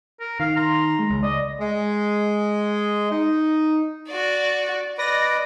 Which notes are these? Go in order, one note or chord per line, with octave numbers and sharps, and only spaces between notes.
A#4
D#3 F5
A#5 C6
G#3
C#2
D5 D#5
G#3
D#4
F#4 D5
B4 D5 D#5 A#6